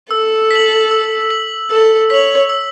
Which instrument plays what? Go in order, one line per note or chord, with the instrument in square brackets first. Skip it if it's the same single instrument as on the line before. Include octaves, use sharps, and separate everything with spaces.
[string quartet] A4 [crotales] E6
[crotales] B6 F#7
E6
B6 F#7
[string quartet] A4 [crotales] E6
[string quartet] C#5 [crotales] B6 F#7
[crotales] E6